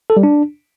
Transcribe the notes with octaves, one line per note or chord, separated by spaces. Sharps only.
A4
G3
D4